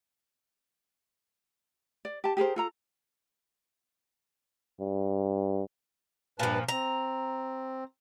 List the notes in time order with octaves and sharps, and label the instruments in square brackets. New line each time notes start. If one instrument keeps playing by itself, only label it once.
[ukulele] D5
G4 A5
G4 G#4 A#4 C5
F4 A4 A#5
[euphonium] G2
[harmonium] G2 B4 A5 [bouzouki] A#2 F3
[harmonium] C4 [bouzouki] A#5